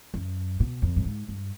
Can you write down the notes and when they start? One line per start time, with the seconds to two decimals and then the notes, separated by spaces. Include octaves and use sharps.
0.14 F#2
0.60 B2
0.82 F2
0.96 G2
1.06 G#2
1.28 G2